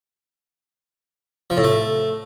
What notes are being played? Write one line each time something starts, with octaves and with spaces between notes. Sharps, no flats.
F3
A2
A3